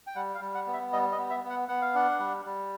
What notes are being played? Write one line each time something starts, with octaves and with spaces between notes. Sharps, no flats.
G5
G3 F#5
F5
G3
F#5
B3
E5
G3 D#5
D#5
B3
E5
B3
F#5
B3 F#5
F5
D4 F#5
G3
G3